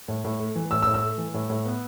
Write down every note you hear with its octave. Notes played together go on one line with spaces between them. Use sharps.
A2
A2
A3
E3
A2 E6
E6
A2
E6
A3
E3
A2
A2
B3